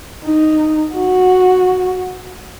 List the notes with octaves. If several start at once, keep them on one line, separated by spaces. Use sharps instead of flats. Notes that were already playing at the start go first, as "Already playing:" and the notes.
D#4
F#4